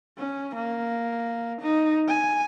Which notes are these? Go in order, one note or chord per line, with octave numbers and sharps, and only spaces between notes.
C#4
A#3
D#4
G#5